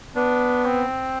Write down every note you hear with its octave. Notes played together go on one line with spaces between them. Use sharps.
B3 D4
C4